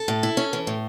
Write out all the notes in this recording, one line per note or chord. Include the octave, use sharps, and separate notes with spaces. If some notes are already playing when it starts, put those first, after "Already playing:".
Already playing: A4
A2
E4
C#4
E3
A2